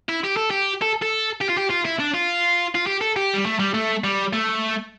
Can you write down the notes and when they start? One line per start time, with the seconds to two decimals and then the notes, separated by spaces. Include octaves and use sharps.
0.09 E4
0.24 G4
0.37 A4
0.51 G4
0.82 A4
1.02 A4
1.41 G4
1.49 F4
1.57 G4
1.70 F4
1.85 E4
1.99 D4
2.14 F4
2.75 F4
2.87 G4
3.01 A4
3.17 G4
3.34 G3
3.46 A3
3.59 G3
3.74 A3
4.04 G3
4.33 A3